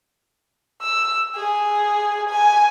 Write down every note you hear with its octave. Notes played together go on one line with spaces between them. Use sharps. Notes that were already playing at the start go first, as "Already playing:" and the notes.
E6
G#4
G#5